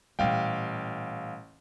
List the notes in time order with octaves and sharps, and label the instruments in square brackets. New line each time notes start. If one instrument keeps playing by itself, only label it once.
[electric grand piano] A1 F5 G5 [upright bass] A#2 G3